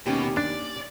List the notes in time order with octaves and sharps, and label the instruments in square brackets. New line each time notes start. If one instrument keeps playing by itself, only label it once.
[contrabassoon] D#2 [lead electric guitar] B2 [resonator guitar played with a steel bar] C#4 G4
[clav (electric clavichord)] D4 [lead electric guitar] D5